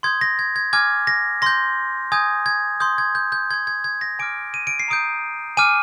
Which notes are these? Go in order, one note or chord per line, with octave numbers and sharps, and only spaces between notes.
C6 D#6 G6 G#6
A#6
G#6
G#6
G#5 D6 F6 G#6
A#6
C6 G6 A#6
G#5 D#6 G6 G#6
G#6
C6 D#6 G6
G#6
G6
G6
C6 G6 G#6
G#6
G#6
A#6
G#5 D6 F6 D7
D#7
D7
C7
A#5 D#6 G6 D7
G#5 D6 F6 D#7